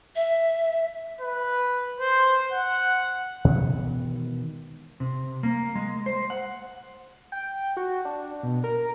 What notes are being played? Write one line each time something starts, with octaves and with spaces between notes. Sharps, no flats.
E5
B4
C5
F#5
B2 D#3 E3 G#3
C3
A#3
G#3
C5
F#5
G5
F#4
D4
B2
A#4